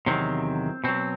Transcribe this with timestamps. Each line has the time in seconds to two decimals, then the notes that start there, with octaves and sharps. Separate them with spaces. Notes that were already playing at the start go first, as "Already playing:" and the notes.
0.06 E2 C3 D#3 F#3 C4
0.84 B2 F#3 C4